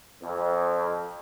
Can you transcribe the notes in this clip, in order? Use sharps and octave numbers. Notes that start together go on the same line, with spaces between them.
F2